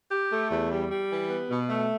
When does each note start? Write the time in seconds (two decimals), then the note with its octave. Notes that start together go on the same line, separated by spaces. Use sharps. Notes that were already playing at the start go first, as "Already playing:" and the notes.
0.11 G4
0.31 A3
0.51 E2
0.70 G3
0.90 G3
1.10 E3
1.29 B3
1.50 B2
1.69 A3